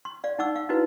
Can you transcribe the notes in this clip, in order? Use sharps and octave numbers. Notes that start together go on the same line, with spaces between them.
C6
D5 F5
D#4 F#5 D6 E6
F5
D#4 E4 F#4 B4